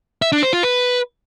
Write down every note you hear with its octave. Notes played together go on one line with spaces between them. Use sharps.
E5
D4
C5
F4
B4